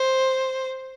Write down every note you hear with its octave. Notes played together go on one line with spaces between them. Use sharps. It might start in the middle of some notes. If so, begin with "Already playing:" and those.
Already playing: C5